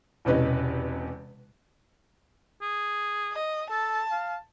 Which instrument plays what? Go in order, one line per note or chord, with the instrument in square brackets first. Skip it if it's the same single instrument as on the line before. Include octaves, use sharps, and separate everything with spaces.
[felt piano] E1 E2 C3 C#4 B4 D#5
[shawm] G#4
[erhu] D#5
[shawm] A4 [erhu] A5
[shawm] F5